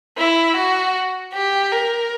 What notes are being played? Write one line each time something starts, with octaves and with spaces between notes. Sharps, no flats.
E4
F#4
G4
A#4